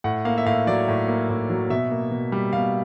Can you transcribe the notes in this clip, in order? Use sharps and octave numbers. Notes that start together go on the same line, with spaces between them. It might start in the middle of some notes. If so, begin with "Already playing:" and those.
A2 F#5
A#3 F5
E5
A2 F5
F#3 D5
A2
A#3
A2
F#3
B2 E5
A#3
B2
G3
B2 F5